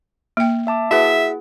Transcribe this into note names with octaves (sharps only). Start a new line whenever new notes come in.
A#3 G5
E5 A5 D6
E4 F#4 G#4 B4 E5 F#5